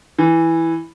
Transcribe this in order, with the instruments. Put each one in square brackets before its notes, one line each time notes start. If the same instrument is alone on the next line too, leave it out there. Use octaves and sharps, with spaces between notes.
[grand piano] E3